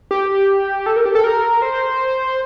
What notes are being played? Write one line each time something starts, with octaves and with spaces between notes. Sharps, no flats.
G4
A4
A#4
G4
A4
A#4
C5